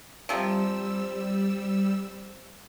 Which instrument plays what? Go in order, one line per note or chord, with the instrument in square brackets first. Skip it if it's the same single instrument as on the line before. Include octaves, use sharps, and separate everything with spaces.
[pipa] C3 F3 [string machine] G3 E6